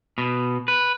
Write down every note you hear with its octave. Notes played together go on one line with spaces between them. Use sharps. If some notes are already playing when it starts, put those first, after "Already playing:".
B2
B4